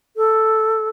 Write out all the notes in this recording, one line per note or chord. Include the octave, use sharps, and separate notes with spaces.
A4